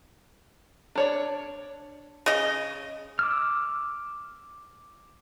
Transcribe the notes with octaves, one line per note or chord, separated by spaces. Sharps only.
D4 C#5 D5
C#3 D#5
D6 E6 F6